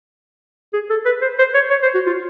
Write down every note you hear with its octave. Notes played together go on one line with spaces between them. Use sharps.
G#4
A4
B4
C5
C5
C#5
C#5
C5
F#4
F4